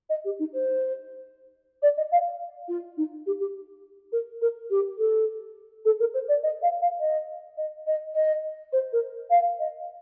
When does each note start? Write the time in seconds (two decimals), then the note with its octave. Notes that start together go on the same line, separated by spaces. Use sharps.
0.10 D#5
0.25 G4
0.39 D#4
0.54 C5
1.82 D5
1.97 D#5
2.12 F5
2.68 F4
2.97 D#4
3.26 G4
3.40 G4
4.12 A#4
4.42 A#4
4.70 G4
4.98 A4
5.85 A4
6.00 A#4
6.14 C5
6.28 D5
6.43 D#5
6.62 F5
6.81 F5
7.00 D#5
7.57 D#5
7.87 D#5
8.15 D#5
8.73 C5
8.93 A#4
9.30 F5
9.59 D#5